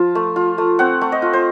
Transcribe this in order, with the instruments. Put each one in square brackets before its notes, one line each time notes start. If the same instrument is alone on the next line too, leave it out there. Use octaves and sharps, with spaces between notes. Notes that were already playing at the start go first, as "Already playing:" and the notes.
Already playing: [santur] F3 F4 A5
A3
F4
A3
C4 F#5
A3
D#5
F4
C5